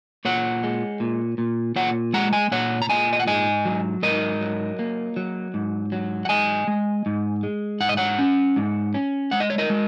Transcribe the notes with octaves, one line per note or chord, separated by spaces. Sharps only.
A#2 C#5 F#5
G#3
A#2
A#2
A#2 C#5 F#5
G#3 F#5 A#5
D#5 G#5
A#2 C#5 F#5
A#5
A#2 D#5 G#5
D#5
F#5
G#2 D#5 G#5
F#3
G#2 A#4 D#5
F#3
A#3
F#3
G#2
F#3
F#5
G#2 D#5 G#5
G#3
G#2
G#3
G#2 F#5
D#5
C#5 F#5
C#4
G#2
C#4
G#3 F#5
D#5
C#5
A#4 D#5
G#3